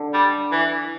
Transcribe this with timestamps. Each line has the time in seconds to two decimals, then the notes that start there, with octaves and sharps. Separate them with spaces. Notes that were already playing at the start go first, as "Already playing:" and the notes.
Already playing: D3
0.13 G3
0.52 E3